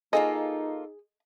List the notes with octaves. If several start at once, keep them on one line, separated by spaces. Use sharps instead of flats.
A#3 D#4 F4 G#4 A4 D#5